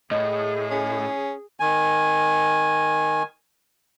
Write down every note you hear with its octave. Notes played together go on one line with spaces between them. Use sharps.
A2 G#4 D#5
C#4
D#3 G#5